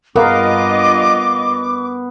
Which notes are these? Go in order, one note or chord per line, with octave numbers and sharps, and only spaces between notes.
G2 B3 F4 A#4 D#5 F5 D6